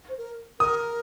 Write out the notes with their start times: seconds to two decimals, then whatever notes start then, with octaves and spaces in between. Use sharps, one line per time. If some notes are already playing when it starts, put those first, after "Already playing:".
0.09 C5
0.18 A#4
0.60 A#4 D#6